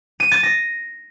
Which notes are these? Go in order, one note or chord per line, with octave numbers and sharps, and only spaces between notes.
D#7
A6
A#6